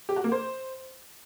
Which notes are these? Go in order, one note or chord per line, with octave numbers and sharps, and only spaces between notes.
G4
F#4
A#3
C5